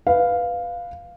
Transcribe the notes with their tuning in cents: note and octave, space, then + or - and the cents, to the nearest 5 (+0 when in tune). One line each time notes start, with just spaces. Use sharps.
B4 +0 F5 +0